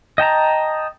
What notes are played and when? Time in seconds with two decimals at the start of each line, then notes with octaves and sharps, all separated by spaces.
0.18 D#5 G5 A5 A#5